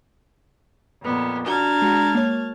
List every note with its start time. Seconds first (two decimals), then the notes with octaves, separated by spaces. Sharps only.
1.02 F2 A#2 B3
1.48 D4 F#4 A5 A#5 F6 G#6
1.82 G#3 F#4
2.15 A#3 C#5